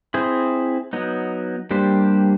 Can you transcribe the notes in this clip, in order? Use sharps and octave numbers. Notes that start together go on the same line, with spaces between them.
C4 E4 G#4 C5
F#3 B3 D#4
G3 A#3 D4 G4 C5